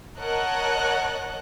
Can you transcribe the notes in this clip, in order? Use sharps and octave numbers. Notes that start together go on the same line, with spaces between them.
A#4 C#5 D#5 F#5 A5 F#6